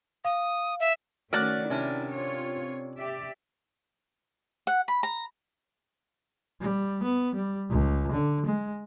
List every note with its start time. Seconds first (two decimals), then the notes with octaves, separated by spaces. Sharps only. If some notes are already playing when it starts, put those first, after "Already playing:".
0.25 F5 D#6
0.80 E5
1.33 D#3 A3 C#4 F#4 A#4 D5 F#6
1.70 C3 C#4 D4 E4
2.12 C4 F4 C#5
2.97 G4 D5 E5
4.67 F#5
4.88 B5
5.03 A#5
6.61 G3
7.03 B3
7.35 G3
7.69 C#2
8.12 D3
8.46 G#3